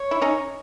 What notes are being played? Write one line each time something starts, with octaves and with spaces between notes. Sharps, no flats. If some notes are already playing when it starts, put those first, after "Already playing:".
Already playing: C#5
E4
C#4 D#4